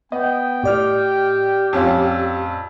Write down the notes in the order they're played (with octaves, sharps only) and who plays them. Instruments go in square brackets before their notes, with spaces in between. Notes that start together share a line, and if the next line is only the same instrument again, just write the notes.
[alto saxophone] B3 [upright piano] D#5 [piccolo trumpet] G5
[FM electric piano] A2 D5 F6 [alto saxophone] G4
[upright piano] F2 C#4 F4